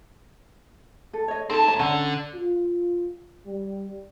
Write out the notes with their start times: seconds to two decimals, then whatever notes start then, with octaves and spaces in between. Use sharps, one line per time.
1.13 A4
1.28 C#5 D#5
1.50 C4 D#4 A4 A5
1.67 C#5 A#5
1.79 D3 C#4 F#5
2.35 F4
3.46 G3